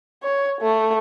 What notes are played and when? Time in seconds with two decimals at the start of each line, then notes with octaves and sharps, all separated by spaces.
0.23 C#5
0.61 A3